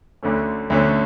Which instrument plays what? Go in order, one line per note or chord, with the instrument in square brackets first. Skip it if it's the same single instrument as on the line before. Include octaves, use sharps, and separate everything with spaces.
[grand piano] D2 D3 A3 C#4
D2 D3 A3 C#4